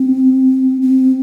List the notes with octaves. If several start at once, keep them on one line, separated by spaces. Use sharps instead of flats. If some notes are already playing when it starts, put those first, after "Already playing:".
Already playing: C4
C4